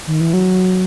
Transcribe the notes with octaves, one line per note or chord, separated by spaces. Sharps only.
D#3
E3
F#3